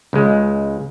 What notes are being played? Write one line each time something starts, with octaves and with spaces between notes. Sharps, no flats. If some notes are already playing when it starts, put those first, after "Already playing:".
C#2 G#3